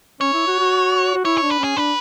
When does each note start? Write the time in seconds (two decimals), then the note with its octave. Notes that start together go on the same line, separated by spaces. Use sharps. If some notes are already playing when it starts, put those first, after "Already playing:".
0.21 C#4 C#5
0.33 E4
0.47 F#4
0.59 F#4
1.15 F#4
1.25 E4 C#5
1.38 D4 C#5
1.51 B4
1.59 C#4 G#4
1.77 D4 B4